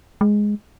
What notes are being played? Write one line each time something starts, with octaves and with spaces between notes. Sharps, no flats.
G#3